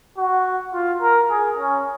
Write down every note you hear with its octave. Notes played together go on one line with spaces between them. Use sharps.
F#4
F4
A#4
G#4
C#4